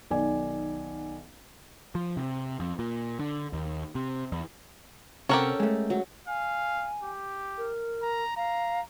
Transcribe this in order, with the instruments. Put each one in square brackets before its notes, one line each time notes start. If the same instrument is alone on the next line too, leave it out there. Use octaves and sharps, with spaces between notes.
[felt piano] B1 D#3 D5 G#5
[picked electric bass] F3
C3
F2
A#2
D3
D#2
C3
E2
[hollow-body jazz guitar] C3 [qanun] C#4 A4 F#5 [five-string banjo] G4 A#4 C#5
[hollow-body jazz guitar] G#3 A3
[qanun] F#3
[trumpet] F5 [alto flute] G#5
[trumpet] G4
[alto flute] A#4
[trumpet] A#5
[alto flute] F5 [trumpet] A#5